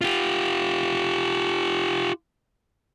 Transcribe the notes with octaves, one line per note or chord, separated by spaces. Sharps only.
F4 G4